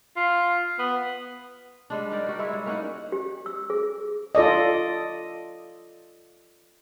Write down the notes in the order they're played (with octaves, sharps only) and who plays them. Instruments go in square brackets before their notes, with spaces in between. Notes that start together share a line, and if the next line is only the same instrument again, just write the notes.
[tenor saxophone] F4
B3
[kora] G3 G#3 D4
D#4 G4 A#4 D5
G3 F#4
G#3 E4 C#5 E5
G3
A#3 C#4 D#4 F#5
[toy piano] G4
E6
G#4
[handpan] F4 A4 D5 D#5